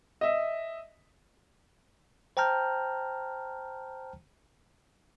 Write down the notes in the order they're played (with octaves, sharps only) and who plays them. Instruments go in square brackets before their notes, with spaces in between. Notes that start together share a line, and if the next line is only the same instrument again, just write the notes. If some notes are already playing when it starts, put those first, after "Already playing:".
[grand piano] D#5 E5
[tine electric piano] C5 G5 A5 A#5 F6 G6